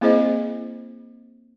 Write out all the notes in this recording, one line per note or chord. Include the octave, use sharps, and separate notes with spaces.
A#3 C4 E4 G#4 C5 D#5